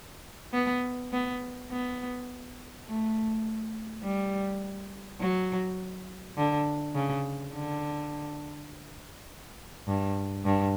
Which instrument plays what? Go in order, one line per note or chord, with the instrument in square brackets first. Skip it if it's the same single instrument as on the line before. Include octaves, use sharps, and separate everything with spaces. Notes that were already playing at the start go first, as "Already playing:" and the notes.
[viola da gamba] B3
B3
B3
A3
G3
F#3
D3
C#3
D3
G2
G2